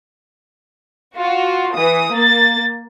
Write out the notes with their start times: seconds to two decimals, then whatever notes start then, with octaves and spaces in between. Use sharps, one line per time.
1.16 F4 F#4
1.75 E3 D#6
2.13 A#3 A6